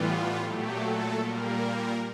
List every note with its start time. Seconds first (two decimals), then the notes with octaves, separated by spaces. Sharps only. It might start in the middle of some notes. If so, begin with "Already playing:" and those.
Already playing: A2 E3 G3 B3 F4
0.36 A#2 F#3 A3 G4
0.76 A4
1.15 A#2 G3 A#3 A#4